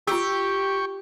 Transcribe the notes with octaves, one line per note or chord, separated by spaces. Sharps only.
F4 G4 G5 C#6 E6